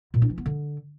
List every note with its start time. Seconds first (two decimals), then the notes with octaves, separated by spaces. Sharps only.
0.14 A#2
0.22 D4
0.30 E3
0.38 B3
0.46 D3